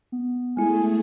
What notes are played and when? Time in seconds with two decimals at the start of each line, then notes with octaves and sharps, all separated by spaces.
0.12 B3
0.57 G#3 A3 E4 G#4 G#5